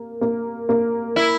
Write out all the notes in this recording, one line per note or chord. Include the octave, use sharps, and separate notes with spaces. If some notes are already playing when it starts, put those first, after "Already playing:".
Already playing: A#3
A#3
A#3
E4